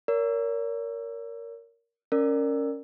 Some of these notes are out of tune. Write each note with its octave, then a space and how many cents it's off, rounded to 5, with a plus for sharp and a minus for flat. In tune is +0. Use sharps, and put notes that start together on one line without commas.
A#4 +0 C#5 +40
C#4 +0 A#4 -15 D5 +15